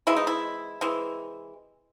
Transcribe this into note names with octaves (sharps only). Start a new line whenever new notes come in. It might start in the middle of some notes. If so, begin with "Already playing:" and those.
C3 E3 G#3 E4
D#4
E4
C3 E3 G#3